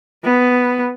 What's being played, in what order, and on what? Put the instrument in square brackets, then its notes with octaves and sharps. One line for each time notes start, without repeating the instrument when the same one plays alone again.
[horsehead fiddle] B3